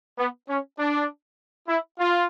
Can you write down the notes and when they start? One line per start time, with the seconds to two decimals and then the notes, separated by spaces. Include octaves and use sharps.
0.18 B3
0.48 C#4
0.78 D4
1.67 E4
1.99 F4